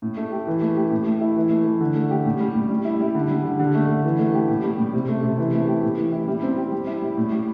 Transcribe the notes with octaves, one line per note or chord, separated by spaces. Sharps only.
A2
A3
G4
E3
A3
G4
A2
A3
E4
E3
A3
E3
D3
A3
G4
A2
G3
A2
G3
E4
G3
D3
G3
D3
D3
A3
D3
E3
A3
G4
A2
G3
A2
C3
A3
C3
E3
A3
G4
A2
E3
E4
G3
C4
G4
G3
E4
G3
A2
G3